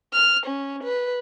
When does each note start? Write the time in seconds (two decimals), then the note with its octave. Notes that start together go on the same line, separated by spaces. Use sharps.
0.14 F6
0.47 C#4
0.84 B4